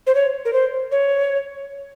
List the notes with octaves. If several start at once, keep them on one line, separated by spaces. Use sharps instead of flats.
C5
C#5
A#4
C5
C#5